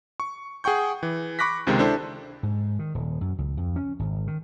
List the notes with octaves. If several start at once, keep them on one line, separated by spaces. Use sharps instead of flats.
C#6
G#4 F#5 G5 C#6 G6
E3
B5 C#6 D6 F#6 A#6 B6
C#2 C3 D#3 G#3
D4 E4 A4 C5
G#2
D#3
D#1
F#2
C#2
F2
C#4
G#1
D#3